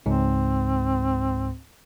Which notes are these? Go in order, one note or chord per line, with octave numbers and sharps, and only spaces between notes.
C#2 G#2 C4